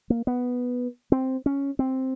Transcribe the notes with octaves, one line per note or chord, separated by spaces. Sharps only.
A#3
B3
C4
C#4
C4